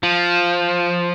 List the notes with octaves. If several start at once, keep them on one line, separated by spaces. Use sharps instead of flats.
F3